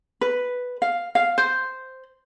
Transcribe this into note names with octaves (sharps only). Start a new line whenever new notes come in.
B4
F5
F5
C5